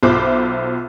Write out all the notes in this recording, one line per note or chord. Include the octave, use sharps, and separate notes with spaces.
B1 F4 C5 E5 B5 D6